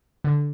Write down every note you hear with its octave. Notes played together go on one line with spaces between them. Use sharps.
D3